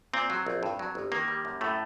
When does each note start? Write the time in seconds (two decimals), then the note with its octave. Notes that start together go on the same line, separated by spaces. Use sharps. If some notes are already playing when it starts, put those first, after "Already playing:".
0.13 A#2 C4
0.30 F#3
0.46 A#1
0.63 G2
0.79 F#3
0.95 G1
1.12 D#3 A#3
1.28 G3
1.45 F#2
1.61 A2 A3